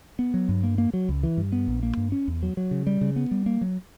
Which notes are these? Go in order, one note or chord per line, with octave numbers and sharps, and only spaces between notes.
B3
F#3
G2
A#3
A#3
F#3
C#2
E3
G2
B3
A#1
A#3
G2
C#4
E2
F#3
F#3
C#3
G3
C#3
B3
G3
A#3
F#3